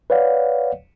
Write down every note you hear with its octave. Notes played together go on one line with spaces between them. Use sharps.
B4 C#5 D5 F5 F#5